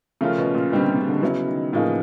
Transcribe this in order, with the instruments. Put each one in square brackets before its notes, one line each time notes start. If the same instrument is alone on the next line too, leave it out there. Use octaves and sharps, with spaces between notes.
[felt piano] C#3 [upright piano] F3 A3 C#4 F4 A#4
[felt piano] B2
A#2
[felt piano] B2 [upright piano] D3 G3 C4
[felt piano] C3
C#3
D3
[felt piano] C#3 [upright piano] F#3 B3 E4
[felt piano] D#3
[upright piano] A2 F3 A#3 D#4 G#4 [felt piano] D#3
[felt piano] E3